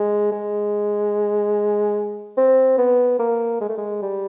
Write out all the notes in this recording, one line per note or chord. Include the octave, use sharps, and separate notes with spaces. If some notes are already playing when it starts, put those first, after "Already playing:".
Already playing: G#3
G#3
C4
B3
A#3
G#3
A3
G#3
G3